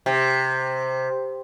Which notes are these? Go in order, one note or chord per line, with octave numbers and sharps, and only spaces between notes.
C3